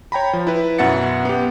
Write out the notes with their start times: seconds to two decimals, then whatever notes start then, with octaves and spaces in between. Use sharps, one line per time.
0.12 C#5 G5 A#5 B5
0.33 F3
0.47 E4 B4
0.78 F#2 B2 E5 F#5 A6 C#7
1.25 B3 G4